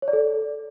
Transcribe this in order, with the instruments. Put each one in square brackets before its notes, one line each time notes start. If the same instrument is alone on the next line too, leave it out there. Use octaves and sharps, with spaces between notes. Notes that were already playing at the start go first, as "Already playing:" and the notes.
[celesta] C#5
D5
A4